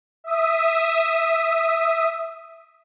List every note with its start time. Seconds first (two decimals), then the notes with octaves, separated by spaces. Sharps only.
0.24 E5 D#6